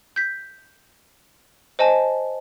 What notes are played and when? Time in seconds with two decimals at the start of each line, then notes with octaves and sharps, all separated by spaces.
0.16 G6 B6
1.79 C5 D#5 G#5 A5